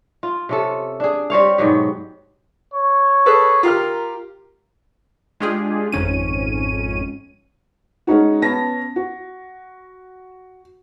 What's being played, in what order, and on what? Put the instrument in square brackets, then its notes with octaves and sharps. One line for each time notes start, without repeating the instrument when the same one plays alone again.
[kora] F4
C3 C#4 A4
D4 G#4
G3 C4 C#5 F5
G#2 B2 F#3 G4
[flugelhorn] C#5
[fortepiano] G#4 A4 B4
[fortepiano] F4 G4 F6 [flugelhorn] A#4
[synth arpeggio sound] G#3 D4 F4 G4 G#4
G#1 F2 G#2 C#4 D#7
[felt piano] G#3 C#4 D#4 F#4
B3 C#4 A5 A#6
F#4